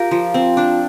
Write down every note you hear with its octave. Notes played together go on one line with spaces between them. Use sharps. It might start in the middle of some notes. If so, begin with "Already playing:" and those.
Already playing: F4 G4 A#4
F3
C4
D4